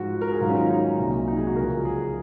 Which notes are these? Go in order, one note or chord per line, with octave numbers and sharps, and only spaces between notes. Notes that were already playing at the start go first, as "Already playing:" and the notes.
Already playing: G#2 F3 F#4
A#4
G#4
G#2 D#3 F#3 F4
C#4
D#4
D#4
C2 A#2 F#3
D#4
G#4
F#4
C#2 C#3 F3 A#4
G#4